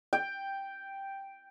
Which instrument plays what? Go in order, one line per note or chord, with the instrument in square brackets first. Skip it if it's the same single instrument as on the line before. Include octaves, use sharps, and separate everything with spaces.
[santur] G5